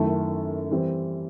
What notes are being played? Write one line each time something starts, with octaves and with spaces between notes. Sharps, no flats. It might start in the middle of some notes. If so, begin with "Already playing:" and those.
Already playing: F#2 D#3 A3 E4 A4
E3 G3 C4